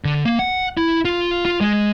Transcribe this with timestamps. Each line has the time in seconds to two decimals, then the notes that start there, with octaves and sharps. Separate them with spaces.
0.05 D3
0.26 A#3
0.39 F#5
0.77 E4
1.05 F4
1.45 F4
1.61 G#3